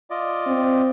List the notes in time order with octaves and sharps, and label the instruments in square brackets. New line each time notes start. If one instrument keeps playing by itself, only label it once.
[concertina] F4 D5 D#5
[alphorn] C4